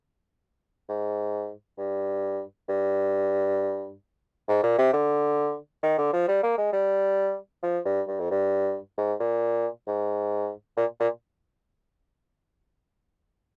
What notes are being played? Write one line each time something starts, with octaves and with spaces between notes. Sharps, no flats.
G#2
G2
G2
G#2
A#2
C3
D3
D#3
D3
F3
G3
A#3
G#3
G3
F3
G2
G2
F2
G2
G#2
A#2
G#2
A#2
A#2